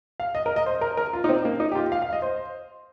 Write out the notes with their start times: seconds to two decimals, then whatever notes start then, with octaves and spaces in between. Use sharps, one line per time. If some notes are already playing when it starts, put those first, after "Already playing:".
0.20 F5
0.35 D#5
0.46 A#4
0.56 D#5
0.66 C5
0.81 A#4
0.97 A#4
1.13 F4
1.24 D#4
1.29 C4
1.45 A#3
1.60 D#4
1.72 G4
1.75 F4
1.92 F5
2.02 F5
2.13 D#5
2.22 C5